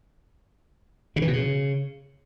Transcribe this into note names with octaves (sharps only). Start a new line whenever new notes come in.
C#3
E3
B2
C#3